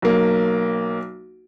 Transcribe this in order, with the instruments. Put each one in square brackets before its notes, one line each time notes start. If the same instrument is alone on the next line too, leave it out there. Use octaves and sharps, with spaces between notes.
[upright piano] B1 A#3